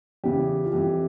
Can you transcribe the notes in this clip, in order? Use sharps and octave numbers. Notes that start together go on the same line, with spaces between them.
E2 C#3 E3 G4
F4
F2 E3 G4